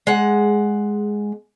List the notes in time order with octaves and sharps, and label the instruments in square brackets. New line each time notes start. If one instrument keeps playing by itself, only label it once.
[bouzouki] G#3 F#5